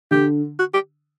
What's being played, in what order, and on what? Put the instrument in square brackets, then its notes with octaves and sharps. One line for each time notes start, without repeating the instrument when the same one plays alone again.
[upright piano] D3 [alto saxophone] G4
[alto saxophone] F#4
G4